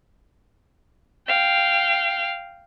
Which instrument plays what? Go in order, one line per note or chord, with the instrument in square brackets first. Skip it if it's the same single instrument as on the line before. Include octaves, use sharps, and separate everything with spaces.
[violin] F5 G5